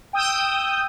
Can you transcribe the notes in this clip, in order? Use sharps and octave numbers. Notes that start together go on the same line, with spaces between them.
G5 D#6 E6 G6